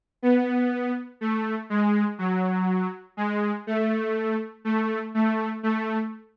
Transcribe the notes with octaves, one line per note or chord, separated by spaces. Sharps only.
B3
A3
G#3
F#3
G#3
A3
A3
A3
A3